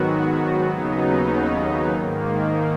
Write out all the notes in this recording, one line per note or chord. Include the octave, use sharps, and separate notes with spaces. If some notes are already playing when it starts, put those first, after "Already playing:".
Already playing: G#2 D#3 F#3 B3 F#4
D#2 C#3 F#3 B3 D#4
G#2 D#3 A#3